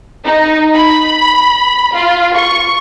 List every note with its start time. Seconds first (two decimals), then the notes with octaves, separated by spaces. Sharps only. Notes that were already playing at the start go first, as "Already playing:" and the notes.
0.24 D#4
0.74 B5
1.93 F4
2.35 C#6